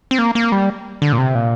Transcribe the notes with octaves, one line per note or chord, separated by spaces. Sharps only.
C4
A#3
A#3
G3
D3
A#2
C3
A#2